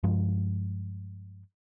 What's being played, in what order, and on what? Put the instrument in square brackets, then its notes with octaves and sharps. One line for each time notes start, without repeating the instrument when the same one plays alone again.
[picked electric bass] G2 F3 G#3